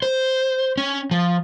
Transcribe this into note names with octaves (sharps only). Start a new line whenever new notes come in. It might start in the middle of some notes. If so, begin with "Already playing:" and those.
C5
C#4
F3